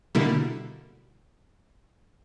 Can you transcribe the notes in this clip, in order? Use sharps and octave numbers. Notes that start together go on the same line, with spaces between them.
B2 D3 G3 A3 A#3 E4